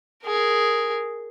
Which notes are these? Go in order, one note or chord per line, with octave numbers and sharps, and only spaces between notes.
G#4 A#4